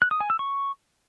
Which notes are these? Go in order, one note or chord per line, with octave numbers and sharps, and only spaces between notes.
F#6
D#6
G#5
E6
C#6